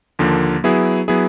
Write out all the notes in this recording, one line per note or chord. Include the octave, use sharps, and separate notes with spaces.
D#2 D3 F3 A#3
F#3 B3 E4 G#4
F#3 B3 E4 G#4